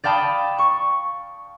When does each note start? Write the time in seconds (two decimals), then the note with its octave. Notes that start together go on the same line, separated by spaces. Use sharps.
0.04 D5 F5 G5 A5 B5 D#6
0.58 C#6